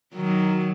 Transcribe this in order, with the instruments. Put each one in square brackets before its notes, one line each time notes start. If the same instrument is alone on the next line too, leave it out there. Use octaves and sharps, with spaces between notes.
[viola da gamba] D#3 F#3